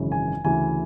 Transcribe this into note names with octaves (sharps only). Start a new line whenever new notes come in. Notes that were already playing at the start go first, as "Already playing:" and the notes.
Already playing: G#1 F#2 C#3 E3
G#5
D2 C#3 E3 G#5